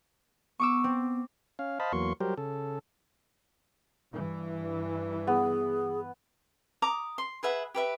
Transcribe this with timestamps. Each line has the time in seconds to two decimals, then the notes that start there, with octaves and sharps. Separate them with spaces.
0.60 B3 C#6 D6 E6
0.84 C4
1.59 C#4 F5
1.80 C5 D#5 F5 A5 B5
1.92 E2 F#3 A#3 C6 C#6
2.20 F#3 G3 G4 A#4 C5
2.38 C#3 A4
4.13 G2 E3
5.27 B3 G#4
6.82 A#5 D6 D#6
7.18 C6
7.43 G#4 B4 E5 F#5
7.74 G4 B4 E5